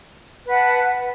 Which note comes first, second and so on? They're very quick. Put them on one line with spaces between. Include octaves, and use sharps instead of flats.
B4 F#5 A5